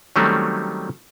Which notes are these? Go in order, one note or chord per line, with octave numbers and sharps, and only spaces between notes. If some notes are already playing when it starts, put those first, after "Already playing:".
D#3 F#3 G3 A3 C4 C#4